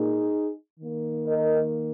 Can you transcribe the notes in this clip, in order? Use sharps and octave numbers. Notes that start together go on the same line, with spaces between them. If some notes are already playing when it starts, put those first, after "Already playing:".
Already playing: A#2 A#3 D#4 G#4
D#3 A#3
A#4 D#5